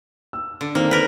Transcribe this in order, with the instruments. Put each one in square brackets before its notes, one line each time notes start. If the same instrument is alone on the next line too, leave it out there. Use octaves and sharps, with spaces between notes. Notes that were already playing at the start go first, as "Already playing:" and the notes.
[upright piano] E6
[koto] D3
[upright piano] D#3 C4 [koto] A#3
[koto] A#4 B4